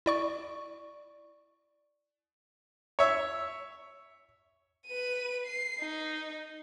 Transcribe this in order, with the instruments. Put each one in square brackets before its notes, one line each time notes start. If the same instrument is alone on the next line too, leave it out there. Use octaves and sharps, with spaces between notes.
[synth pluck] E4 D5 C#6
[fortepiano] C#5 E5
[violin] B4 D#7
C7
D#4